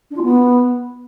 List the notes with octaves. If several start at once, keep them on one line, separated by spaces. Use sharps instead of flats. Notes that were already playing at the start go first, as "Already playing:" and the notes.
D4
F4
B3